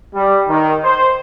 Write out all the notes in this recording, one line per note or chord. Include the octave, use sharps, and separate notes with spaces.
G3
D#3
C5